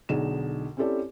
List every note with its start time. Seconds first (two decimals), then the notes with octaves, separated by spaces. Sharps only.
0.09 B1 D3 D#4 G#4 E7
0.77 C4 C#4 E4 G4 A4 D5